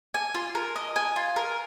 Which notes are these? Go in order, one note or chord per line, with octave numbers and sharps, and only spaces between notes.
G#5
F4
A#4
D#5
G#5
F4
A#4